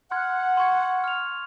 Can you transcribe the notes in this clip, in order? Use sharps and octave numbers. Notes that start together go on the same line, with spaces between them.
F#5 C6 F6 G#6
C6 C#6 G#6
F6 F7